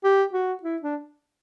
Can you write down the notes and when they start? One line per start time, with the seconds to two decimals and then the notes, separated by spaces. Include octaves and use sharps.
0.04 G4
0.33 F#4
0.63 E4
0.82 D4